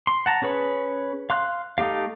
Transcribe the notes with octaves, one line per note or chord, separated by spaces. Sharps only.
C6
F#5 A5 A#5
C#4 G#4 B4 C#5
F5 C6 F#6
A3 D#4 G4 F5